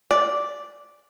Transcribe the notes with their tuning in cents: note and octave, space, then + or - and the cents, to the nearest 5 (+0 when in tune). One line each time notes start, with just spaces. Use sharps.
D5 -5